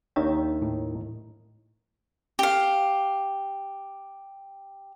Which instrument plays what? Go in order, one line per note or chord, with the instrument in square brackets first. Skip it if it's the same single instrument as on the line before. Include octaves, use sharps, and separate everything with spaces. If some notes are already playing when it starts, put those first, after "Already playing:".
[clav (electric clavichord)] D#2 D#3 E5 [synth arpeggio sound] D4 C#5 G5
[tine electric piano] A2
[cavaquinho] G4 F5